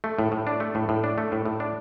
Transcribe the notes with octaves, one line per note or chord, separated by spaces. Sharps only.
A3
A2
A2
D4
A3
A2
A2
D4
A3
A2
A2
D4